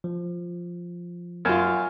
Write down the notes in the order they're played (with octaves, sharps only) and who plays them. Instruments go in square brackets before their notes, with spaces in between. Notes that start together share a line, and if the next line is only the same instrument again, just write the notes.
[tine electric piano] F3
[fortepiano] F#2 F4 [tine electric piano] G#5 F6